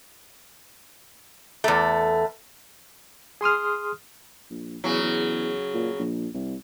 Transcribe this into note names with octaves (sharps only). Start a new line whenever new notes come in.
E2 A3
G#4 C6 D#6 F6
A#1
E2 C#3 F#3
E2
A#2
A#1
C2